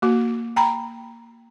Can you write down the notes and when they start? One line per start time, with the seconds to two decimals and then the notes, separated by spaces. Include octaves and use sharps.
0.02 A#3 F#4
0.56 G5 A#5 B5